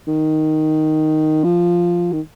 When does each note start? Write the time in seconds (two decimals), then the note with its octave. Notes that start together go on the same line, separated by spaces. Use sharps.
0.08 D#3
1.44 F3
2.13 D#3